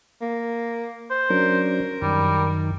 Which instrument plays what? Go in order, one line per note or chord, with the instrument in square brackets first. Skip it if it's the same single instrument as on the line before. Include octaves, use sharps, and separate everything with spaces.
[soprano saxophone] A#3
[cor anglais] C5
[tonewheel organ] F#3 C#4 D4 [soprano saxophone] A#4
[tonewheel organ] F#2 D#3 [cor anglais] G3